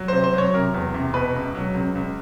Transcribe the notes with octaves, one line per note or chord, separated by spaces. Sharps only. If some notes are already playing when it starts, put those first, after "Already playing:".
Already playing: F#3
C3 C5
C5
F#3 C#5
C3 A#4
E2
C3
B2 B4
C#2
F#3
C#2
C#2